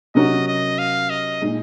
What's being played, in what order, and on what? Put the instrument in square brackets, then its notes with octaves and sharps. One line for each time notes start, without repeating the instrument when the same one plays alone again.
[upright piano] C3 F#3 C#4 F#4 A#4 [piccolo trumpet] D#5
[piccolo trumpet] D#5
F5
D#5
[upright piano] A#2 G#3 D#4